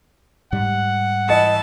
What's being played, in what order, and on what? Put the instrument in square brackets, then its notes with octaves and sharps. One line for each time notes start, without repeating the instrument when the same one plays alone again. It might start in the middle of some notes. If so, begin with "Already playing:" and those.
[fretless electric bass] G#2 G3 [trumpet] F#5
[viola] E3 A5 [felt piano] D#5 C#7